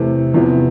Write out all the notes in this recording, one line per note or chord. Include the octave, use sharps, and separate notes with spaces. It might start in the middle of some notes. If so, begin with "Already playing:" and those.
Already playing: E2 C3 E3 A3 A4
E2 C3 F3 B3